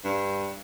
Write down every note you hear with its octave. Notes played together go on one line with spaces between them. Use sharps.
G2